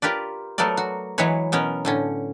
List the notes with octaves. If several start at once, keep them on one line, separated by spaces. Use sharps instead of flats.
F4 G4 A#4 B4 D5
F#3 A3 B3 A#4 D5
F#4
E3 F#3 G#3 B4 C#5
B2 B3 C#4 A#4
A2 D3 C#4